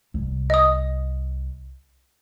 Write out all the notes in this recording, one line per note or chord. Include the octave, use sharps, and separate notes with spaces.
C2
D#5 D#6